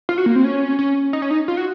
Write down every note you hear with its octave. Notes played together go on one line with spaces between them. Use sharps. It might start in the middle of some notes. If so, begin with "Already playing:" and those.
F4
F#4
A#3
C4
C#4
C#4
D#4
C#4
D#4
F4
F#4